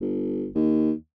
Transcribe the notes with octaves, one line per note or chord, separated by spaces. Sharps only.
G1
D#2